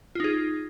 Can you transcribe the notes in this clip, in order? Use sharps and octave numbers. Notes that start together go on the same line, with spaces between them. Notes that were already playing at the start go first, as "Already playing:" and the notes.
D#4 F4 G#4